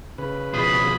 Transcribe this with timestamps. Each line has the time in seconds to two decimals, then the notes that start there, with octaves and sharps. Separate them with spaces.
0.18 C#3 B4
0.54 B2 F3 G#4 B5